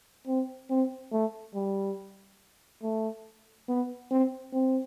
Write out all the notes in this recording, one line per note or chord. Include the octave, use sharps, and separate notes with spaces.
C4
C4
A3
G3
A3
B3
C4
C4